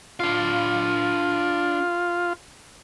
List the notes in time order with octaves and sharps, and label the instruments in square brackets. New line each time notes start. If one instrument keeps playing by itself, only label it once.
[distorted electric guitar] D4 F5 [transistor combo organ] F4